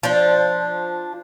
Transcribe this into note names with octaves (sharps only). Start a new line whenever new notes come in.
F3 D4